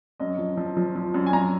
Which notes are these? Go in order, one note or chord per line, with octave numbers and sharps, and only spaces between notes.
F#2 D#5
F3
F3
F3
F3
F#2
G#5
F#2 A#5